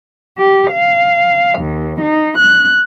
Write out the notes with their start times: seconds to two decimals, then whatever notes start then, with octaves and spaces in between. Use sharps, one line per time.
0.37 G4
0.70 F5
1.58 D#2
2.01 D#4
2.37 F#6